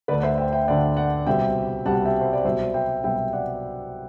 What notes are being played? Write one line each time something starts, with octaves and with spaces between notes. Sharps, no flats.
D2 D3 A3 B4 D5
F#5
C5 E5
E5 G5
E5 G5
D2 D3 A3 D5 F#5
D5 F#5
C2 B2 G3 C4 E5 G5
C2 B2 G3 C4 F#5 A5
E5 G5
C5
D5
C2 B2 F#3 C5 E5
E5 G5
C2 B2 F#3 E5 G5
D5 F#5